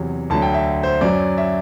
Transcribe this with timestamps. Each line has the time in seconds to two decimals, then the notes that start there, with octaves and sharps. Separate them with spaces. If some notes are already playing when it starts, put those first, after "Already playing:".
Already playing: E2 C3 F#3
0.30 D2 D3 F#3 A5
0.42 G5
0.54 E5
0.83 C5
1.01 F#2 F#3 D5
1.38 E5